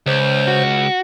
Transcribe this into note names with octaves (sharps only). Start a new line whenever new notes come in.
C#2 C#3 C5 G6
F#4